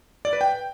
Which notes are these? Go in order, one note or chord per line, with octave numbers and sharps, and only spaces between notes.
D5
B4
G5